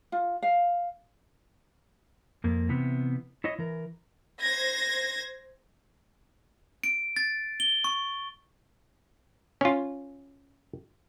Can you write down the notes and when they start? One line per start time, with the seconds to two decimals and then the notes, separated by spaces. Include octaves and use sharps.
0.12 F4
0.42 F5
2.44 F2 A#3
2.69 C3 E3 B3
3.44 E4 C#5 D#5
3.59 E3 A#4
4.41 C5 G#6 A#6
6.84 D7
7.16 A6
7.60 G7
7.84 C#6
9.61 C#4 F4